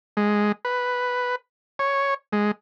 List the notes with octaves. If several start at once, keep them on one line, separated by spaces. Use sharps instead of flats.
G#3
B4
C#5
G#3